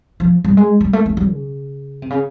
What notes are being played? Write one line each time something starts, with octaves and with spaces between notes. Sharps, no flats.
F3
G3
G#3
G3
A3
A3
G3
C#3
C3
C#3